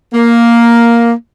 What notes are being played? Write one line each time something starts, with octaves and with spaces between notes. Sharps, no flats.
A#3